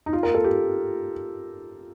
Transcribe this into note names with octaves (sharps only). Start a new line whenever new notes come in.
D#4
F4
A#4
A4
G4